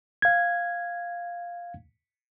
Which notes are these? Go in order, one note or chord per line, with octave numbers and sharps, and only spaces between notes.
F5 G#6